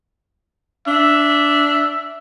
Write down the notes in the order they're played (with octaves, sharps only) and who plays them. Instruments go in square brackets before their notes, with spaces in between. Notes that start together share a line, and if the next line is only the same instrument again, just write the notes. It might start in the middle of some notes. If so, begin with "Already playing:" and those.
[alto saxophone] D4 [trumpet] E5